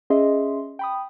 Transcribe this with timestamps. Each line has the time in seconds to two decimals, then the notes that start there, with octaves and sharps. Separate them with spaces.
0.10 C#4 G#4 D#5 E5 C6
0.79 G5 B5 D#6